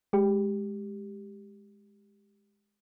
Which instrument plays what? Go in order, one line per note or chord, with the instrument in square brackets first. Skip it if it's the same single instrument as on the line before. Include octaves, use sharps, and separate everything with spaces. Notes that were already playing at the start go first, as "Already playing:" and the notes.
[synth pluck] G#3 G4